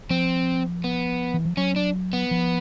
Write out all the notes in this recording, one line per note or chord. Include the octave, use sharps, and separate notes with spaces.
F3 C4
B3
E3
F3
F#3 C#4
D4
B3
F3